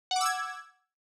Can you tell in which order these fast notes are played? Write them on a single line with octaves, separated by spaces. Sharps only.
F#5 D6 E6 G#6